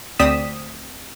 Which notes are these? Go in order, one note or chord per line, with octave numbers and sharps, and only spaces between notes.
D2 C4 D5 D#6 B6 E7